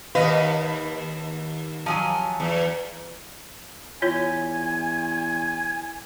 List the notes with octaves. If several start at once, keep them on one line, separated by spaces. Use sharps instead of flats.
D#2 B4 D#5 F5
F3 F#3 G#5
E2
E2 F4 C#5 G#5